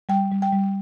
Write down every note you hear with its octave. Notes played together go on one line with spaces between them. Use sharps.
G3 G5
G3
G5
G3